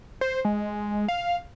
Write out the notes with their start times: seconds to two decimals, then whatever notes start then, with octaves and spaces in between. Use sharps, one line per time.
0.21 C5
0.45 G#3
1.08 F5